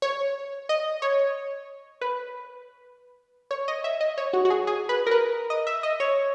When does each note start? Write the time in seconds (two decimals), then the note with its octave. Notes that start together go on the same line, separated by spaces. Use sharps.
0.02 C#5
0.69 D#5
1.02 C#5
2.01 B4
3.51 C#5
3.68 D#5
3.84 E5
4.01 D#5
4.18 C#5
4.33 F#4
4.45 F#4
4.50 G#4
4.67 G#4
4.89 B4
5.06 A#4
5.11 B4
5.50 D#5
5.67 E5
5.83 D#5
6.00 C#5